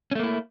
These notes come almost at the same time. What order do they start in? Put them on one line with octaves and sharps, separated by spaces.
C#4 A3 A#3 E4